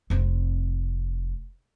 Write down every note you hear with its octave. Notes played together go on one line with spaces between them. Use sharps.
F1 C4